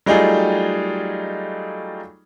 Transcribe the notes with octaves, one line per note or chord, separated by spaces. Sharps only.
F#3 G3 A3 D#4 F4 G#4